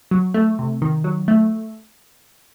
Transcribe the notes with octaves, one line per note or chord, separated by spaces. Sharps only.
F#3
A3
C3
D#3
F#3
A3